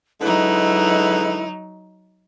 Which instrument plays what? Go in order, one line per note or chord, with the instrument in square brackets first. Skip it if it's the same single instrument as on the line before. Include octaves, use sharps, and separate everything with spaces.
[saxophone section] D3 G#3 B4 [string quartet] F#3 D#4 [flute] E4